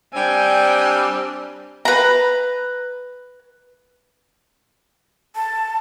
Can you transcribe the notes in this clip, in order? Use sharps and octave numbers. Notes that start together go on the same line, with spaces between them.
G3 C4 D4 G5 G#5
B4 A#5
A5